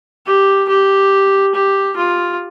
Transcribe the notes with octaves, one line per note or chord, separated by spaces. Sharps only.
G4
G4
G4
F4